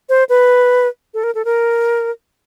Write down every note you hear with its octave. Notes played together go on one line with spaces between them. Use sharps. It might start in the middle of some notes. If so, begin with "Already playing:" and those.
C5
B4
A4
A#4
A4
A#4